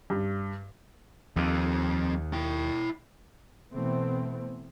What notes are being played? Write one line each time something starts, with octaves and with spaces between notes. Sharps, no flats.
G2
D#2 F3 C4
E4 G5
B2 E3 A3 B3 C4